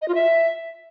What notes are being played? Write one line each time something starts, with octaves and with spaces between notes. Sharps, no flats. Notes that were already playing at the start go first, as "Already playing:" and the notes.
D#5
F4
E5